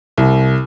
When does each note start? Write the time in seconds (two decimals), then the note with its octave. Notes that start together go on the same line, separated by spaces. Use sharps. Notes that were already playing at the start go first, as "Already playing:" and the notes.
0.18 C2